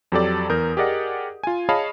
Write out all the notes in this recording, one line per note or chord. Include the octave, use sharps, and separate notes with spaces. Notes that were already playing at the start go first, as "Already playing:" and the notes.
F2 F#3 G4 A4 D5
E2 A#4 D#6 G6
G4 G#4 A#4 D5 D#5 F#5
F4 G#5
G#4 C#5 D#5 F5 A5 B5